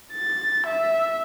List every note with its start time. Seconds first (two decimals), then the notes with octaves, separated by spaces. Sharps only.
0.12 A6
0.67 E5